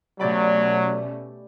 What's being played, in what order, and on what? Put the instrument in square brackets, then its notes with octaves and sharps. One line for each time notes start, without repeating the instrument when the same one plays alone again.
[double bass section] B2 A3 C#4 [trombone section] F#3 [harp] G4 D5 B5